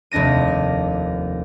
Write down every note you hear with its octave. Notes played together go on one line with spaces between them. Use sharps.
F1 D#2 D4 A#6 D#7